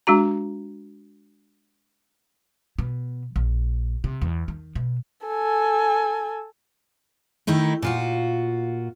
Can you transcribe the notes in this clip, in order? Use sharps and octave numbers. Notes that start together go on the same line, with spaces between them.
G#3 D4 F#4 A#5
B2
A#1
C3
E2
D#3
B2
A4 G#5
D#3 A3 D#4 E4
A#2 F4 F#4